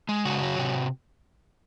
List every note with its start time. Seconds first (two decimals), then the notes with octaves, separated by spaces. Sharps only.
0.09 G#3
0.25 C#3 F#4
0.42 F#3
0.58 C3